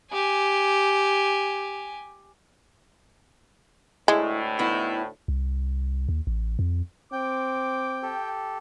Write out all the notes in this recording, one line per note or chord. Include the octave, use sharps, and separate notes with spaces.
G4 G#5
D2 A2 G#3 E4
B3 D#4 E4
C2
D#2
A1
F2
C4 G5 D6
G4 A4